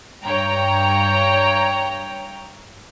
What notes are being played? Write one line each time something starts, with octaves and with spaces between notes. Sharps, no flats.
G2 C#5 G5 A#5